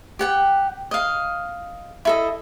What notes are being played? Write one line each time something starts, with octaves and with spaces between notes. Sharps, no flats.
G4 F#5 G5
D#5 F5
E4 A4 D#5